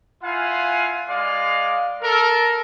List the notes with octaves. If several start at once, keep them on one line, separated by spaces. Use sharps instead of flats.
E4 F4 F5 F#5 G#5
G#3 D5 F5
A4 A#4